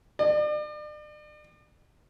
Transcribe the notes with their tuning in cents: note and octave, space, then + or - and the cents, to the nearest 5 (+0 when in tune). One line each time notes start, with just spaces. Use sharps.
D5 +40